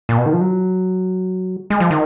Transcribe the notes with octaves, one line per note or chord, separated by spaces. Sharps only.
A#2
B2
D#3
F3
F#3
G#3
F3
D#3